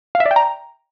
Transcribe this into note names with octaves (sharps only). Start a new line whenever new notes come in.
F5
E5
D5
G5
A#5